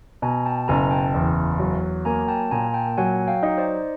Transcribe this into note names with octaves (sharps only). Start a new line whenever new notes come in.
B2 G#5 A#5
G5 A5
F#1 G#5 A#5
G5 A5
E2
F#3
A#3 G#5 A#5
G5 A5
A#2 G#5 A#5
G5 A5
F#3 F#5 G#5
F5 G5
D#4
C5 D5